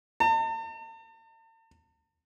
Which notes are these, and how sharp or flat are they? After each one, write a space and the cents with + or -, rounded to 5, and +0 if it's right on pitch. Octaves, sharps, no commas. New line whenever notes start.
A5 +45